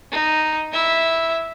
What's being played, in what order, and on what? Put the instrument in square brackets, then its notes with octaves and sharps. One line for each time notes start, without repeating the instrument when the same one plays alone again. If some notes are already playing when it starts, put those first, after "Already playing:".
[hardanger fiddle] D#4
E4 E5